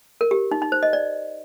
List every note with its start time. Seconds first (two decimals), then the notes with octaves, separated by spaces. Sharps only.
0.21 A#4
0.31 G4
0.51 D#4
0.62 D#4
0.72 C5
0.83 D#5
0.93 D5